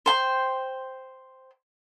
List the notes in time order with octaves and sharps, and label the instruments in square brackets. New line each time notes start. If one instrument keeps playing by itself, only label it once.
[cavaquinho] C5 G5 C6